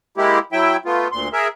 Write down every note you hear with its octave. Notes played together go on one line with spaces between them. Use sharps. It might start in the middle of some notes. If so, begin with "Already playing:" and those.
G#3 A#3 E4 G4
F#3 E4 E5 G5
A3 B3 F4
D2 A#2 C6
G#4 A#4 E5